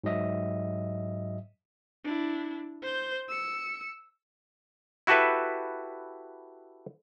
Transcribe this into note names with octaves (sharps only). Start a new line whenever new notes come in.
G#2 F#3 D#5 E5
D4 E4
C5 G6
E6 C#7
E4 F#4 G4 A4 B4 E5